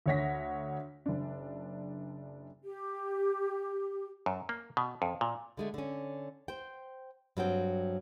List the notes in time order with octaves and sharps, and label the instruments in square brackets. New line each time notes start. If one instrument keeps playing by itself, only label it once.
[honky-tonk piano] D2 D3 C#5 F#5 A#6 B6
F#1 D4
[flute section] G4
[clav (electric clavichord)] F#2
A#3
B2
F2
A#2
[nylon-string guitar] D3 G#3 A3
D3 C#4
C5 G5
G2 F#3 C4 G5